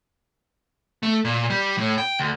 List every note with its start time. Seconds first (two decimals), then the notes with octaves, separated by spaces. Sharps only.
1.03 A3
1.25 A#2
1.50 G3
1.78 A2
1.98 G5
2.19 D2